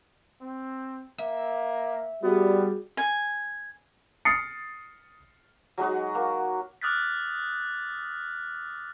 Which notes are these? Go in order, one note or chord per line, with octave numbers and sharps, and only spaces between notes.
C4
A#3 E5
G3 B3 F#4 G#4
G#5
D#6 F6 A6 C7 C#7
F#3 G#3 D#4 F#4
A#3
D6 D#6 F6 F#6 A6 B6